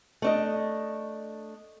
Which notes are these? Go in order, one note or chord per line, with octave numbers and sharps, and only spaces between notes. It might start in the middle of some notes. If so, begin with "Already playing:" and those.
A3 D4 D#5